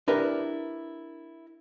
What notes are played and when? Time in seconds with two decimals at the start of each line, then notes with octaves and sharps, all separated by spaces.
0.08 D4 E4 G4 A#4 B4